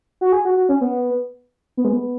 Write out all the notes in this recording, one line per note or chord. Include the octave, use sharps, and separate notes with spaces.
F#4
G#4
F#4
F#4
C#4
B3
B3
G#3
B3